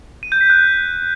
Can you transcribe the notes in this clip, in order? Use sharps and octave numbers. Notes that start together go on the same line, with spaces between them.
D#7
G6
B6
F#6